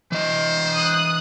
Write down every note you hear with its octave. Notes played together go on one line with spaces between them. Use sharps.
E3 C5 D#5
D#6 F#6